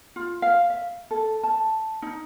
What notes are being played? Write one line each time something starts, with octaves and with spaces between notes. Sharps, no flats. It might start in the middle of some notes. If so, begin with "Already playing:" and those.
F4
F5
E5
A4
A5
D#4